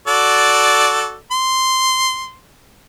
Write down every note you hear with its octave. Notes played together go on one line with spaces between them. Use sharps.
F#4 A4 D5
C6